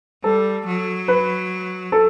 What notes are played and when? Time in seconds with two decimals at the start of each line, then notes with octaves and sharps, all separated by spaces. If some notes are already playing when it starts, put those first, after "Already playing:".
0.23 G3 A4
0.66 F#3
1.08 B4
1.92 A4